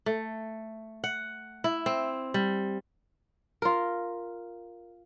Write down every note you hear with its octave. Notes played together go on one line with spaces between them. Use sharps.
A3
F#5
E4
C4
G3
F4 A#4